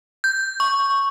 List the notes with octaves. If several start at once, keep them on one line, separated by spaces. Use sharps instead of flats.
G6
C#6